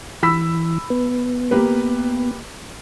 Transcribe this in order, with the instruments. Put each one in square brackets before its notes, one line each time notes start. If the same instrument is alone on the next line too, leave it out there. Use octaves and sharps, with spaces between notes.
[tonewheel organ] E3 [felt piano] B5 E6 B6
[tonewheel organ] B3
[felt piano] A#3 G4 B4